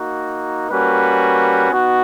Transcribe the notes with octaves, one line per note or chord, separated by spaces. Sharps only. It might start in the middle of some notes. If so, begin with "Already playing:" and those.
Already playing: A#3 D#4 F#4
G3 A#3 C#4 F#4 B4
B3 D#4 F#4